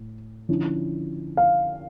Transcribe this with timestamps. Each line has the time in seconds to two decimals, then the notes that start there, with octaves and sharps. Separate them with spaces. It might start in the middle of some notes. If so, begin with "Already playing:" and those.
Already playing: A2
0.49 D3 F3 C#4 E4
1.37 F5